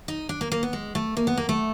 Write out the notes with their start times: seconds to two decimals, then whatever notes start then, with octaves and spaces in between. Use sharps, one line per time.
0.08 D#4
0.29 D4
0.41 A#3
0.52 A#3
0.63 B3
0.73 G#3
0.95 A3
1.17 A#3
1.27 B3
1.37 A#3
1.49 A3